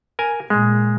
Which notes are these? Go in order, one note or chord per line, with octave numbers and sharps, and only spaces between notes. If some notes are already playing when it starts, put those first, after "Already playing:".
A#4 G#5
A#2 G#3